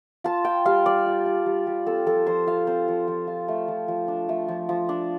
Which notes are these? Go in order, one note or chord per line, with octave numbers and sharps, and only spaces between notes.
F4 A5
F4 G5
G3 F5
G3 D5
F4
F4
G3
G3
C4 A4
F3 A4
F3 C5
F4 F5
C4 C5
F3
F3
F4
A3
F3
F3
D4
A3
F3
F3
D4